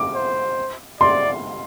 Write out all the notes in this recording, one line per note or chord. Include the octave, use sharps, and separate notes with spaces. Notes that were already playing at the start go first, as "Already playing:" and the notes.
Already playing: D6
C5
D5 C6